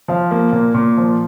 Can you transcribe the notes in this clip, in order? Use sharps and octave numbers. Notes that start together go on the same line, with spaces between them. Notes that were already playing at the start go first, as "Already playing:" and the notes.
F3 F5
A#3
A#2
A#2
F3